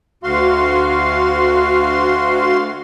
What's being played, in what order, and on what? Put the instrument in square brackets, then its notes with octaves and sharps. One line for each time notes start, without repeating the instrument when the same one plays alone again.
[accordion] D2 F#4 F5 C6